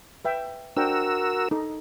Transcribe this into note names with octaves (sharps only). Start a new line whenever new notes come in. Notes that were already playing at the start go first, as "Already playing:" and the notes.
B4 E5 G5
D4 F#4 A#4 C5 G5 E6
D#4 A4